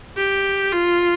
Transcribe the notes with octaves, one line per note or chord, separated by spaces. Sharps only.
G4
F4